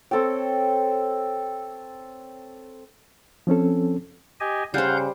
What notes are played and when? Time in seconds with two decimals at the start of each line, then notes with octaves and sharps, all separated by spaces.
0.11 C4 A4 C#5 G5
3.47 F3 C4 C#4 A4
4.40 G4 D#5 G#5
4.74 C#3 G3 C5 F5 F#5 G6